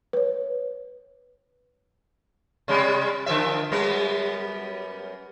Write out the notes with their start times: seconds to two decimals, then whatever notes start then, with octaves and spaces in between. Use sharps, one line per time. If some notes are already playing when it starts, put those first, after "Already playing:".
0.13 B4 C#5
2.68 C3 G3 G#3
3.26 D3 F3 E5
3.72 F#2 G3 B3